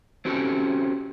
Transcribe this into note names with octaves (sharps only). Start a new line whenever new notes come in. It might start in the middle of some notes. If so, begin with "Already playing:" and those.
C4 C#4 F#4 G4 A4